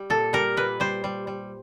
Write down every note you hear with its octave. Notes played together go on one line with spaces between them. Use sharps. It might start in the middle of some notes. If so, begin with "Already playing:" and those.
Already playing: G3
A#2 A4
G3 A#4
A#2 B4
G3 C5
G3
G3